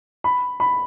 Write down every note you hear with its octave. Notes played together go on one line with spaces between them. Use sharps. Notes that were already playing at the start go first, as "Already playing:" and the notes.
B5
B5